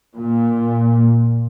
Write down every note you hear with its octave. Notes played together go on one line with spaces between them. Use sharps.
A#2